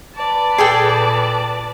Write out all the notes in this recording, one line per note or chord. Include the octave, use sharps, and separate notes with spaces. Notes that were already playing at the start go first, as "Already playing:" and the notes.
B4 D5 A5
A#2 G#4 A4 G5